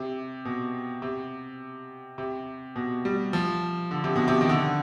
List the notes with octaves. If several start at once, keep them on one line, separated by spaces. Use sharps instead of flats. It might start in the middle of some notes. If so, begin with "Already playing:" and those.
Already playing: C3
B2
C3
C3
B2
G3
F3
D3
C3
B2
C3
D#3
D3